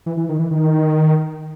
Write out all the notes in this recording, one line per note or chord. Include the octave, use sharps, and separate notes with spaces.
E3
E3
D#3
E3
D#3